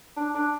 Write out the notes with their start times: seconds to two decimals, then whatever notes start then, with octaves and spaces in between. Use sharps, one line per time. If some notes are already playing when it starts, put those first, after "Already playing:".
0.16 D4
0.34 D4